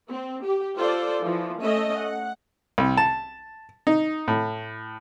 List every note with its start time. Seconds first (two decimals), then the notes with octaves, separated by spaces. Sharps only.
0.11 C4
0.44 G4
0.77 F4 A4 C5 D5
1.22 E3 F3
1.61 A3 C#4 D#5 E5
1.98 F#5
2.78 C2
2.97 A5
3.87 D#4
4.28 A2